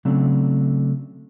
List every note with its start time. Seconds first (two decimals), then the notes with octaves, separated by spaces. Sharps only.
0.05 C#3 F#3 A3 C4 D4